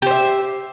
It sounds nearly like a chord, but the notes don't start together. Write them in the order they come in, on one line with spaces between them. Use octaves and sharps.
G4 C5 E5